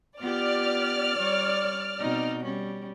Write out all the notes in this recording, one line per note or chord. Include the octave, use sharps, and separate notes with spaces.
B3 F4 G4 D5 F6
G3 C#5
B2 C4 D#4
G3 C#4